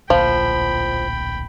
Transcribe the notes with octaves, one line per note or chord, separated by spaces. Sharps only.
D1 A#1 F3 G5 B5